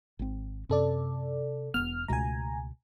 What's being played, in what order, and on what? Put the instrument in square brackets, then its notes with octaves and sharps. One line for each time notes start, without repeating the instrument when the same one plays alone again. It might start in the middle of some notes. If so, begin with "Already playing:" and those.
[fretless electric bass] G#1 C4
[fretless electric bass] F#2 [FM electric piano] C3 A4 D5
[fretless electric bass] E1 E2 B3 [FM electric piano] F6
[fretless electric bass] C#2 B2 A3 [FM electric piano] G#5 A#5